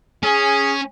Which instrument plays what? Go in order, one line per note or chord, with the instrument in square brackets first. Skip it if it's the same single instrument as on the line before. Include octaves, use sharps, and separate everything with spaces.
[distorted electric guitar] C#4 [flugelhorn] G#4